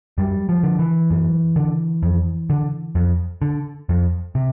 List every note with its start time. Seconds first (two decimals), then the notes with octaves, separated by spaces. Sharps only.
0.18 F#2 G3
0.49 F3
0.63 D3
0.79 E3
1.10 F#2
1.56 D3
2.03 F2
2.50 D3
2.95 F2
3.42 D3
3.89 F2
4.35 C3